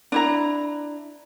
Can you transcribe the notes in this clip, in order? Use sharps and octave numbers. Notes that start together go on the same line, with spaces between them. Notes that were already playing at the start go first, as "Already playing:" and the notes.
D4 E4 A#5